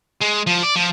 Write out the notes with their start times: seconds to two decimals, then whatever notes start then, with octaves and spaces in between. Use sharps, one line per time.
0.21 G#3
0.47 F3
0.63 D5
0.76 F3